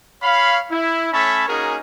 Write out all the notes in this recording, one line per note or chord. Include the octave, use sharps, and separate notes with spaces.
C#5 F5 B5
E4
A3 C#4 C#5 E5 A5 B5
A#3 C#4 D#4 F#4 G#4 A#4